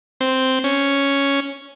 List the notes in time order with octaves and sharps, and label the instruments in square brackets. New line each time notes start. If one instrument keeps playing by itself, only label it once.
[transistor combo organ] C4
C#4